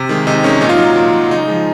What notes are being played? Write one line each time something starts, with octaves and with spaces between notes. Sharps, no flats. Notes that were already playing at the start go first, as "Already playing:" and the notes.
Already playing: C3
D#3 G#3
C3 D#4
D#3 G#3 C#4
A#2 D#4
F4
F#3 D#4
A#2
F#3
C#3 D#4
F3 G#3